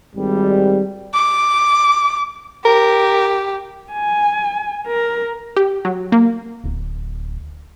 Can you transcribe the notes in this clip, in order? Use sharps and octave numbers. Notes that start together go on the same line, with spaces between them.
G#1 G3
D6
G4 A#4
G#5
A#4
G4
F#3
A#3
D1